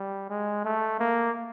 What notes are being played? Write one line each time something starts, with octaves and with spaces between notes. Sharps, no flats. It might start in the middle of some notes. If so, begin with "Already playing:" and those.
Already playing: G3
G#3
A3
A#3